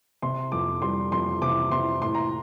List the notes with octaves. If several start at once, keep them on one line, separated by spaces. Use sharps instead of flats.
C3 C6
F2 D6
G3 C6
F2 C6
C3 D6
C3 C6
A2 C6
A#5